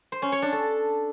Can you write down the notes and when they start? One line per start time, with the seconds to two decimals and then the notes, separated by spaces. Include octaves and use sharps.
0.12 C5
0.22 C#4
0.32 C#5
0.42 D4
0.52 A4